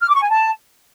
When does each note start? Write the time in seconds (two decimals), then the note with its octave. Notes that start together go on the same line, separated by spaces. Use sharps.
0.01 F6
0.08 D6
0.15 C#6
0.22 G#5
0.29 A5